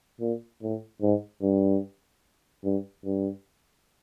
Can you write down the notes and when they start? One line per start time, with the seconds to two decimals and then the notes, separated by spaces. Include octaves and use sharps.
0.21 A#2
0.62 A2
1.02 G#2
1.42 G2
2.64 G2
3.04 G2